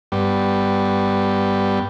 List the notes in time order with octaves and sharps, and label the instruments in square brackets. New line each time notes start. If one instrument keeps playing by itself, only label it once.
[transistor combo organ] G2 G3 B3